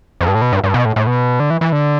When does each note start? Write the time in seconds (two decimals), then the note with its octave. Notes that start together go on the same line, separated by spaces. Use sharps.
0.21 F2
0.28 G2
0.35 A2
0.42 B2
0.53 G2
0.64 G2
0.74 B2
0.85 A2
0.96 A2
1.07 B2
1.40 D3
1.50 E3
1.61 E3
1.72 D3